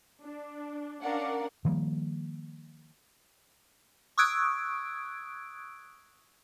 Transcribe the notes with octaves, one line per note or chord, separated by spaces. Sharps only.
D4
C#4 D4 A#4 D5 F5 F#5
D#3 F3 G3 A#3
C#6 D#6 E6 F#6 G#6 D7